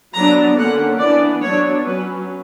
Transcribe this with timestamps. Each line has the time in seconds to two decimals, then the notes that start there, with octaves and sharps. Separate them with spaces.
0.14 F#3 B3 D4 A#5
0.57 D3 A#3 C#4 F#5
0.99 E3 B3 D4 D5
1.42 F#3 B3 D4 C#5
1.84 F#3 C#4 B4